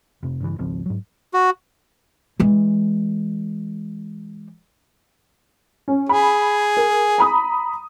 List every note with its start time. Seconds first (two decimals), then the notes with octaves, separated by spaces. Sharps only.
0.23 F1 C3
0.41 G2 C#3 E3
0.59 G#1 C#2 F3 C4
0.86 G#2 F#3
1.34 F#4
2.40 E3 G#3
5.88 C#4
6.09 G#4 B5
6.77 A#4
7.18 A#5 B5 D#6